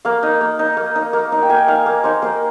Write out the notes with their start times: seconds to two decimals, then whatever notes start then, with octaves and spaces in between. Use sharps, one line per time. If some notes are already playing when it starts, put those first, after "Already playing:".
0.05 A#3 F5
0.23 D#4
0.41 A#3
0.59 D#4
0.77 A#3
0.95 D#4
1.13 A#3
1.32 D#4
1.42 G5
1.49 A#3 G#5
1.68 D#4 F5
1.86 A#3
2.04 D#4 C5
2.22 A#3 C5